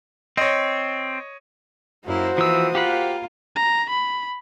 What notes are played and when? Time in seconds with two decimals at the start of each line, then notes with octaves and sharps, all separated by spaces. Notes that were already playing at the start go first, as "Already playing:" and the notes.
0.37 C4 C#5 D#5
2.07 F#2 A#3 E4 F#4 C5
2.38 E3 F3 A#3 D#6 E6
2.75 A#3 F4 G4 F#5 B5
3.56 A#5
3.90 B5